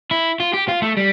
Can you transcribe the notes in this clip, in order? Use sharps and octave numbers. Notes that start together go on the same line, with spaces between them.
E4
F4
G4
F4
A3
G3